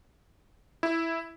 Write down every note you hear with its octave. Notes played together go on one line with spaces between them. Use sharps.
E4